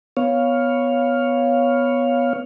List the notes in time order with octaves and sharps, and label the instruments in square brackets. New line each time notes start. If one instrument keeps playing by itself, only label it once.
[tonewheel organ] B3 C#5 F5